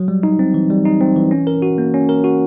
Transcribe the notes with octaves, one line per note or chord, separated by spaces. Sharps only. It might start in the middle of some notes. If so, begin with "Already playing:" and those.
Already playing: F#3
G3
D#4
C4
E3
G3
D#4
C4
E3
C#4
A#4
F#4
A#3
C#4
A#4
F#4